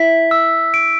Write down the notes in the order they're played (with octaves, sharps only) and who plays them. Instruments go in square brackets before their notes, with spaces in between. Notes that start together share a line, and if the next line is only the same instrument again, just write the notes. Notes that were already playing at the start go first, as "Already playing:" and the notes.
Already playing: [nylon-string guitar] E4 [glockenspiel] B6
[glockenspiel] E6
D7